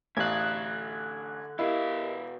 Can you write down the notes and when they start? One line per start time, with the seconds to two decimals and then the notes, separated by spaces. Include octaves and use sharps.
0.17 A1 D3 F5 F#6 G#6
1.59 B2 E4 G4 A#4 D#5 F5